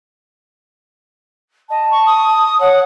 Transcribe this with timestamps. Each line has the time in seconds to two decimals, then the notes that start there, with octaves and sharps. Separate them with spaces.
1.70 D#5 A5
1.91 C#6
2.06 D#6
2.60 C#5 F#5